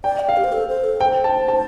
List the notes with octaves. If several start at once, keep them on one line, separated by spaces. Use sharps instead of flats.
D5 G5
G5
F5
G4
C5
A4
C5
A4
C5 G5
A5
A5